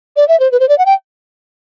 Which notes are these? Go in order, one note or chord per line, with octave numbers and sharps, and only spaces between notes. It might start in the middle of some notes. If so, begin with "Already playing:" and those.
D5
E5
C5
B4
C5
D5
F#5
G5